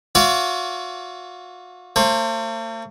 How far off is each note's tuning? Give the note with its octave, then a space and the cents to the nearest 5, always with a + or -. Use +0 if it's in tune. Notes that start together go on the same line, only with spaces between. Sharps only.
F#4 -45 C#5 +45 F5 -45
A3 +45 C5 +35